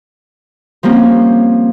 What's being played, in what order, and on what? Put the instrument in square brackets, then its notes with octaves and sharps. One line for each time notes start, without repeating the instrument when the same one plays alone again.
[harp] F3 G3 A#3 C4 C#4